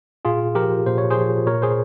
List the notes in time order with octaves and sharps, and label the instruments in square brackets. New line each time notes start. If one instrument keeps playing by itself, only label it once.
[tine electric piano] A#2 F4 G#4
F3 G4 A#4
A#2 C5
C#5
G#4 C5
F3
A#2 A#4 C#5
G#4 C5